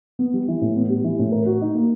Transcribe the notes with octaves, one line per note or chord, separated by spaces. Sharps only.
B3
G3
E3
A2
B3
G3
E3
A2
A#4
F#4
D#4
A#3